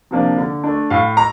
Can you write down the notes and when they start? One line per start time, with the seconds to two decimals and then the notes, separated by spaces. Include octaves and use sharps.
0.11 C3 F3 A#3 D4
0.38 D3
0.64 A3 D4
0.90 A2 F5
1.17 A#5